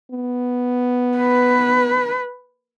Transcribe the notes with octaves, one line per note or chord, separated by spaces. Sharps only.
B3
B4